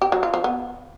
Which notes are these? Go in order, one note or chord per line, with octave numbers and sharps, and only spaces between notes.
G4
F#3
F4
F3
B3